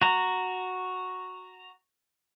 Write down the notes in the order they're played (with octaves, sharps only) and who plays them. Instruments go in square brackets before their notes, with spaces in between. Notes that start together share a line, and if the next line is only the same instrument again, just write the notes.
[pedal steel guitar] F#4 A#5